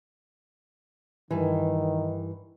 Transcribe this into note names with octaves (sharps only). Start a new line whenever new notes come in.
G2 D#3 E3